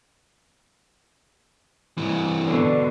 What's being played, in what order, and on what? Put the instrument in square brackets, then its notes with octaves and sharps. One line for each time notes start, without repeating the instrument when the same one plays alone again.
[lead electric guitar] G2 E3
[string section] B2 D3